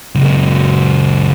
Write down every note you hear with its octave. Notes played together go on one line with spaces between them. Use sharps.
C#2 F#2